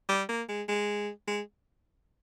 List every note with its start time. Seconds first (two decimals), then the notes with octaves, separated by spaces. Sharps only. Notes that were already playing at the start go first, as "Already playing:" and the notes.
0.09 G3
0.29 A#3
0.49 G#3
0.69 G#3
1.28 G#3